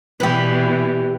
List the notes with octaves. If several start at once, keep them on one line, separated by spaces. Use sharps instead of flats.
B2 E3 G3 G4 B4